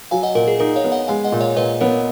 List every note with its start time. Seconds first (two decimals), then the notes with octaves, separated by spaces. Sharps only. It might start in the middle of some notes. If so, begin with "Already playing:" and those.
0.11 F#3 F5 G#5
0.23 D#5 F#5
0.35 A#2 A#4
0.48 G#4
0.60 D#4 A#4
0.76 C#5 F5
0.85 B3
0.92 D#5 F#5
1.08 G#3 F5 G#5
1.24 D#5 F#5
1.32 A#2
1.41 C#5 F5
1.56 A#2 B4 D#5
1.81 B3 A#4 C#5